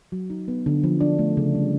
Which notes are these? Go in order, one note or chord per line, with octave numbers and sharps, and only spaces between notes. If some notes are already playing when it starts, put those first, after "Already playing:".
F#3
D#4
B3
D3
F3
D4
A3
C#3
G3